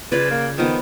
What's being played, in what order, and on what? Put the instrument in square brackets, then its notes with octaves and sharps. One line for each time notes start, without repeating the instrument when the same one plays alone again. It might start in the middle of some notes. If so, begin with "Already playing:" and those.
[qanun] C#3 F4 D5 [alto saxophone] B4
[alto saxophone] A#3
[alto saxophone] D#3 [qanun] F3 B3